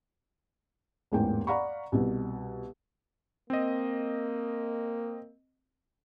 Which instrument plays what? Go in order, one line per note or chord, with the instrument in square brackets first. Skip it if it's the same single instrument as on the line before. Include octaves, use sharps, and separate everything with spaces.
[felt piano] A1 E2 G#2 A#3 G5
D5 F5 F#5 A#5 B5 C#6
C2 B2
[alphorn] A#3 [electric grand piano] C4 D#5